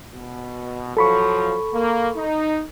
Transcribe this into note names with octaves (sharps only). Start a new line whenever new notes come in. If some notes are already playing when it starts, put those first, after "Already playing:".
B2
F3 F#3 A4 B5 C#6
A#3
D#4